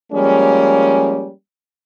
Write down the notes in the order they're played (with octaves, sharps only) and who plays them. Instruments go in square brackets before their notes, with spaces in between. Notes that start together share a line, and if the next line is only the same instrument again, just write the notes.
[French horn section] F3 G3 G#3 A#3 C#4